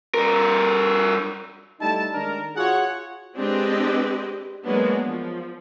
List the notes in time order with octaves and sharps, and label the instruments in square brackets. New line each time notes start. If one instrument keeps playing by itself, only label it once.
[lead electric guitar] G2 A#4
[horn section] G3 A3 D#4 E4 A5
D#3 G#3 D4 A#4
F4 F#4 G#4 C#5 F#5
[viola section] G#3 C4 D4 G4 B4 D#5
F#3 G#3 A#3 B3 D4
F3